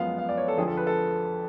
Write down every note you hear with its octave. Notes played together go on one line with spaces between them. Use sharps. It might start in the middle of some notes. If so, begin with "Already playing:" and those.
Already playing: F#2 F3 G#3 B3 F5
F5
D5
C#5
A4
F2 D3 F3 G#4
A4
B4
A4